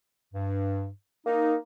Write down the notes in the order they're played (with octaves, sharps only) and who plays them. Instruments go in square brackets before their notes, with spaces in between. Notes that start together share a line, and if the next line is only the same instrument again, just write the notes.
[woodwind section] G2
[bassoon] A#3 [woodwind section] D#4